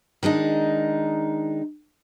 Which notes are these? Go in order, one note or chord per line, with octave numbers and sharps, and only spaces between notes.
D#3 G#3 D4 D#4